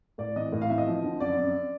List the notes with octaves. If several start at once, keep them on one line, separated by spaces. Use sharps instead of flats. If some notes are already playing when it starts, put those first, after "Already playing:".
A2 D5
E3 D#5
A2
F5
E3 E5
D#5
F3
D3
F#2 D5
F#2